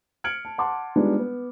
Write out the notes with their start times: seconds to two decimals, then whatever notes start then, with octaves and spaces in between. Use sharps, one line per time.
0.24 F6 G#6 C#7 D7 F#7
0.45 A5
0.58 F#5 A5 C6 D6
0.96 G3 G#3 B3 D4 D#4 F4
1.19 B3